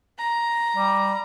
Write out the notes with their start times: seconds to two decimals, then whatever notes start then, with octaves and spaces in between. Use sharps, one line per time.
0.18 A#5
0.77 G3